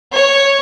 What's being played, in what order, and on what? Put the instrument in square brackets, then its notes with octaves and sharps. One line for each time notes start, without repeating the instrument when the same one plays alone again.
[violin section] C#5